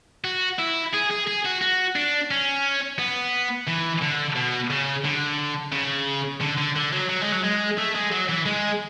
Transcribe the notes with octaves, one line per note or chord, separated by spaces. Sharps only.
F#4
E4
G#4
G#4
G#4
F#4
F#4
D4
C#4
B3
E3
D3
B2
C#3
D3
C#3
D3
D3
D3
F#3
F#3
G#3
F#3
G#3
A3
G#3
F#3
E3
G#3